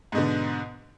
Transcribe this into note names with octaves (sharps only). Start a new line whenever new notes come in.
G#2 B2 D3